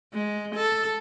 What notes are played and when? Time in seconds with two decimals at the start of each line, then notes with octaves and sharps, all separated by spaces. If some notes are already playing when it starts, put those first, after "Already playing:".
0.13 G#3
0.56 A4